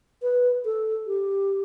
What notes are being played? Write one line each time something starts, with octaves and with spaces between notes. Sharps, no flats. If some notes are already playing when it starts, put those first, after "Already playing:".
B4
A4
G4